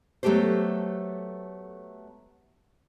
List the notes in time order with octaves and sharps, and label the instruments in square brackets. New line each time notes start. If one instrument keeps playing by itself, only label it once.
[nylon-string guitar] F#3 A3 B3 G4 A4 C5